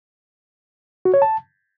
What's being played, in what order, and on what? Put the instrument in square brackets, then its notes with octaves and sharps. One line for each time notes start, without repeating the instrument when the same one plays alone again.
[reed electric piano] F#4
C#5
A5